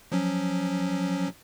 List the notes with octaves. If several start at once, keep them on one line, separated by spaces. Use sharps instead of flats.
F3 F#3 C#4